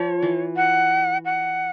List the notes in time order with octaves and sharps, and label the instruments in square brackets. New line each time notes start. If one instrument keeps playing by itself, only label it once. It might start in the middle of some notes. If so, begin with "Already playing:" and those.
Already playing: [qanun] F3 [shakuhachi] C#5
[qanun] E3
[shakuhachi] F#5
F#5